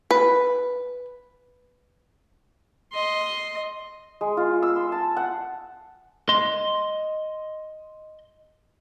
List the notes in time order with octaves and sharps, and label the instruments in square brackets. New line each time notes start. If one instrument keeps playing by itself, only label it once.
[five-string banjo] B4
[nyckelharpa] D#5 C6
[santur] G#3
F4
E6
C6
A5
F#5
[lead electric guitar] D#5 C6